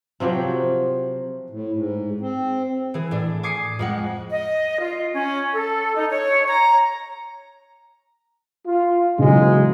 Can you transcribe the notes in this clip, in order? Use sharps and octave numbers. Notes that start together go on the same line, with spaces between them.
C3 F3 F#3 G4
A2
G#2
C4
E3 G#4
A2 D4
G#5 D6 D#6 C7 C#7
F2 G#3 F#5
D#5
F4
C#4
A4
D#4
C#5
A#5
F4
B1 C#3 E3 F#3 G#3